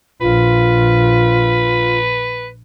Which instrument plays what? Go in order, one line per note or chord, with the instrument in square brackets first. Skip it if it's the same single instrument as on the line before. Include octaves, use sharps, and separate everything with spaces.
[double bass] A#1 [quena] F4 [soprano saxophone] B4